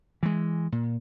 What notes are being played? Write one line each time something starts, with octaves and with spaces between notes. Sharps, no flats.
E3 G#3
A#2